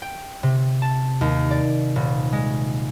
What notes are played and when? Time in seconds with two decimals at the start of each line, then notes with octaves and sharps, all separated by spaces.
0.02 G5
0.43 C3
0.82 A5
1.21 D#2
1.51 D5
1.96 D#1
2.33 G#3